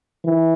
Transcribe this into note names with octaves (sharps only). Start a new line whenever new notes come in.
E3